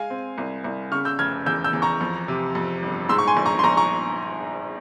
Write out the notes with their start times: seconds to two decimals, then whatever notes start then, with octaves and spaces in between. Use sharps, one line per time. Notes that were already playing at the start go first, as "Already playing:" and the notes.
Already playing: G#3 F5 G#5
0.10 C4
0.38 C2
0.64 C2
0.92 C#3 C#6 F6
1.05 E6 G6
1.19 F1 F6 G#6
1.46 E2 E6 G6
1.64 E6 G6
1.73 E2
1.82 A#5 C#6
2.01 F2
2.28 C3
2.55 F2
2.83 G1
3.09 G#2 C6 E6
3.18 C#6
3.28 G#5 C6
3.37 A#1
3.46 A#5 C#6
3.59 C6
3.64 A#1 A#5 C#6
3.77 A#5 C#6